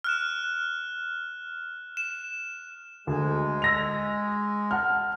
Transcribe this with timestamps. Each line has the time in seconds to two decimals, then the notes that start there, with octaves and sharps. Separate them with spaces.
0.04 F6 F#6 E7
1.97 E7
3.07 D2 G#3
3.62 E6 A#6 F7
4.71 F#5 A5 F6